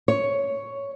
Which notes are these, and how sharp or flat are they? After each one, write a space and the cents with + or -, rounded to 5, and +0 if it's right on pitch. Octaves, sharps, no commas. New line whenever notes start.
C#5 +5